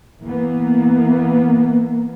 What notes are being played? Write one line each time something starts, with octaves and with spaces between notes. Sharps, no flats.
E3 A#3 B3